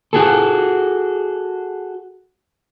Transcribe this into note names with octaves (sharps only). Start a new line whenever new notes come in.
F#4 G#4 A4